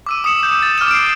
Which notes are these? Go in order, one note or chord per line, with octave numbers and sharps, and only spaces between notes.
D6 E6 D#7
D#6 E6 C#7 E7 F#7
G6
A6
D6 F6 A6 D#7 E7
C7 D7